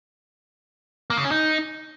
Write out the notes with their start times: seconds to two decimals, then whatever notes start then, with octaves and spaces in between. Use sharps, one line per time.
1.10 A#3
1.17 C#3
1.24 C#4
1.32 D#4